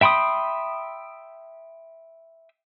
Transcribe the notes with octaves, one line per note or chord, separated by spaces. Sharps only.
E5 G5 B5 C6 D#6